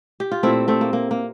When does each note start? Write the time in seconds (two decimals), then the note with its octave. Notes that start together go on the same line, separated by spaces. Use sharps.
0.20 G4
0.32 F4
0.43 A#2 A3 C4 E4
0.68 A3 C4
0.81 A#3
0.93 A#3
1.11 A#3